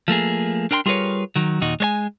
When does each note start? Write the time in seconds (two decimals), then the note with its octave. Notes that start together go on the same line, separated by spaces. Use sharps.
0.08 F3 A3 A#3 G#4
0.71 D4 A#4 G5 A5 C6
0.86 G3 F4 G#4 A#4 B4 C#5
1.36 D#3 F#3
1.61 D#2 A#2 D#4 F#4
1.80 G#3 C#5 G#5